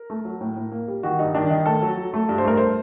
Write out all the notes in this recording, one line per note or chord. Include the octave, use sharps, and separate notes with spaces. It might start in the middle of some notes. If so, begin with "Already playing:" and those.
Already playing: A#4
A3
F#3
A2
A2
A#3
G3
D#3 F#4
G2 D#4
D#3 D4
D#3 D#4
A3 A4
F#3
F#3
A3
G2
C5
A3 A#4
C5